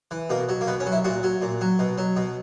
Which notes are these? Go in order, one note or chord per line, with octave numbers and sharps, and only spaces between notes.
E3
B2 A#3
F#3
A#3
B2 B3
C#4
F#3
E4
A#2 F#4
F#3
A#2
F#3
B2
F#3
B2